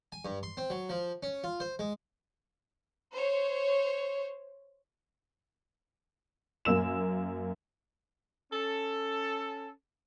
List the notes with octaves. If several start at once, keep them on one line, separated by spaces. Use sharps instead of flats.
G#5
G2
C6
C4
F#3
F3
C#4
F4
C5
G#3
C5 C#5
F#2 A#3 E6 E7
C#4 A4